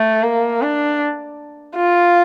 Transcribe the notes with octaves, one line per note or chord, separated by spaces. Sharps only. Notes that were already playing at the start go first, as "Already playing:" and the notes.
Already playing: A3
A#3
D4
F4